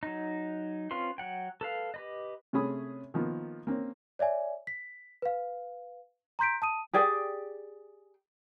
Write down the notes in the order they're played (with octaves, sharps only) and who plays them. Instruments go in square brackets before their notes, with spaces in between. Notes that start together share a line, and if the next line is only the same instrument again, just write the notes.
[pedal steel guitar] F#3 D#4
C4 C#4 F4 B4 C6
F#3 F#5 G5
A4 B4 F5
G4 B4 D#5
[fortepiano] C3 A3 C#4 G#4 B5 D#6
D#3 F3 A#3 B3
A#3 C4 C#4
[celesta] C#5 D5 E5 G#5
B6
B4 F5
A#5 C6 G6 B6 D7
A5 D#6 D#7
[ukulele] G4 G#4 D5 G5